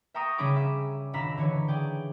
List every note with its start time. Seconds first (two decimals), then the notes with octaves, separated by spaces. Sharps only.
0.14 E5 G5 A#5 C#6 D#6 A#6
0.38 C#3 G3 C#4 G#4 B5 D6
0.56 E5
1.13 D#1 D4 A#5 B5 E6 B6
1.37 D3 E3 C#5
1.68 G#4 D5 G5